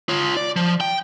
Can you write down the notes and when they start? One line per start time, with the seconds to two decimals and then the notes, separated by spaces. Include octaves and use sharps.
0.09 F4 C#5
0.37 D5
0.57 F3
0.81 G5